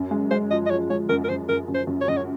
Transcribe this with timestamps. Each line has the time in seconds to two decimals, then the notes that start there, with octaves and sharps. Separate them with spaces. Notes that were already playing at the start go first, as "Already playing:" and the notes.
Already playing: F#2
0.11 G#3
0.31 G#3 C5
0.51 F3 D#5
0.66 D#5
0.70 F3 C#5
0.90 G#3 C#5
1.09 F#2 A#4
1.24 A#4
1.29 F#2 C5
1.49 F#2 A#4
1.68 F#2
1.74 C5
1.87 F#2
2.01 C#5
2.08 F#2 D#5
2.17 C#5